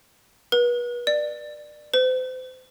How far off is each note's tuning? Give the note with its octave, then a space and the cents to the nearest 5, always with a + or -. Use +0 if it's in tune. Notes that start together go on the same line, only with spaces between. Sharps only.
B4 -35
D5 +20
C5 -35